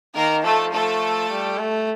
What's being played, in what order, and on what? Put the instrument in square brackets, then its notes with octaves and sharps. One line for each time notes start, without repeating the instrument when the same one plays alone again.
[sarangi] D#3 [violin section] A#3 A#4
[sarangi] F3 [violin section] A3 A4
[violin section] A3 A4
[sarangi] G3
A3